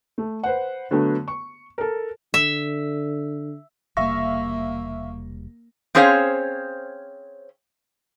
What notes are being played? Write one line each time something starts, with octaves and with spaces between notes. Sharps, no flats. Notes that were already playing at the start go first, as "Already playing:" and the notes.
A3
B4 C5 F#5
D3 F#3 A3 B3
C#6
A4 A#4
D3 E5
E1 C3 G3 A#3 E5 F5 C#6 A#6
C4 C#4 G#4 C5 C#5 F5